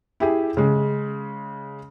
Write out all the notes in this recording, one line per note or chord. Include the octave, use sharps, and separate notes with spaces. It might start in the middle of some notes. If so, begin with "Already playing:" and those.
E4 G4 G#4
C#3 G#3